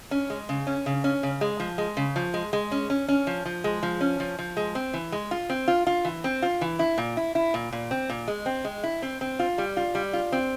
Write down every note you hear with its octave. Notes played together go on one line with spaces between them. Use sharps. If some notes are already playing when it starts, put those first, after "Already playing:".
C#4
G#3
C#3
C#4
C#3
C#4
C#3
G#3
F3
G#3
C#3
F3
G#3
G#3
C#4
C#4
C#4
F3
F3
G#3
F3
C#4
F3
F3
G#3
C4
E3
G#3
F4
C4
F4
F4
E3
C4
F4
E3
E4
A#2
E4
E4
A#2
A#2
C4
A#2
G#3
C4
G#3
E4
C4
C4
F4
G3
F4
G3
F4
C4